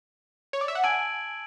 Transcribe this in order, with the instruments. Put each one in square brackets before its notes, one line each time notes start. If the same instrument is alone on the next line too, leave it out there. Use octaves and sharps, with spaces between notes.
[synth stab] C#5
D5
E5
F#5
[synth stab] G#5 [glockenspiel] A5 E6 G#6 D7 F#7